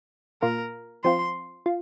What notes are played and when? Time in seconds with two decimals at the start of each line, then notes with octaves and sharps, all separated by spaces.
0.42 A#2 A#3 F4 A#4
1.04 F3 C4 F4 C6
1.66 F4